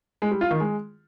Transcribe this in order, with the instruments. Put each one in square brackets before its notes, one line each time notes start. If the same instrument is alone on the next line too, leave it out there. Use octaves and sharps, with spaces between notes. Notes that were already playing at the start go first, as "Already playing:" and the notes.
[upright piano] G#3
G3
F4
D#3
G#3